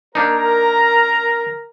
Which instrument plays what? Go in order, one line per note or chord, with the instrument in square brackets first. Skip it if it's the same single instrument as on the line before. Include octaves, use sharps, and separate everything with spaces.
[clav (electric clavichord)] A#3 D4 D#4 [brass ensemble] A#4 [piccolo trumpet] A#5